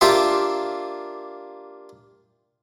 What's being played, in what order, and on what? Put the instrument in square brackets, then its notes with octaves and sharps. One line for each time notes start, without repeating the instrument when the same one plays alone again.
[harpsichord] A#3 D4 F4 G4 C5 E5